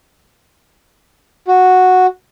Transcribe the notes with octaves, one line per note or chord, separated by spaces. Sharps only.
F#4